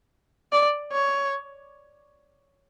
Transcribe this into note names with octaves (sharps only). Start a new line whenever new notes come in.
D5
C#5